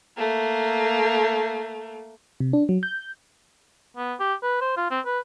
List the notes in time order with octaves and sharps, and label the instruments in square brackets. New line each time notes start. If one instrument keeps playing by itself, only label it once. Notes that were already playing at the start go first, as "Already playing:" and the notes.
[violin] A3 A#3
[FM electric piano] C3
D4
F#3
G6
[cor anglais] B3
G4
B4
C5
F4
C4
B4